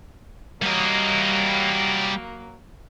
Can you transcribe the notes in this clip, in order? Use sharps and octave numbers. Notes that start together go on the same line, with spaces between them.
F#3 G3 A#3 D#5